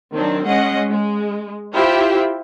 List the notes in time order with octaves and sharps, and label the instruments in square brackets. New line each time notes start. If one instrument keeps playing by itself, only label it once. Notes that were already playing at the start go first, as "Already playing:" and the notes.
[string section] D#3 F#3 C4 D4
G#3 C#4 D#5 F#5
G#3
E4 F4 G4 C5 E5 G5